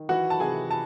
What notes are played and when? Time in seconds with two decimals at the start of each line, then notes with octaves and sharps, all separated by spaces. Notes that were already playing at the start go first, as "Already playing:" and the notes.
Already playing: D#3
0.09 E3 F#4 F#5
0.30 A5
0.40 C3 G#4 G#5
0.71 A5